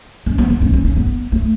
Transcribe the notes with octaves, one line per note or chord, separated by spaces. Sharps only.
C#4
B3
B3
C#4
C#4
C#4
B3
A3